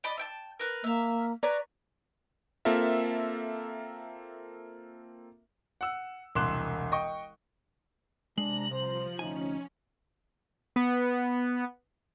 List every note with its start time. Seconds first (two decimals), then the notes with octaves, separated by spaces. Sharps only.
0.04 D5 D#5 B5
0.18 E5 G5 A5
0.60 A#4 B4
0.84 A#3 E5 F5
1.43 B4 C#5 D5 A#5
2.65 A#3 C4 F4 A4 A#4 E5
5.81 F#5 E6
6.35 E1 C2 C6 D6 F#6 E7
6.92 D#5 G5 C#6
8.38 C3 G#3 D4 A#5 F#7
8.71 C2 F3 C5
9.19 D2 C#4 D#4 G#5
10.76 B3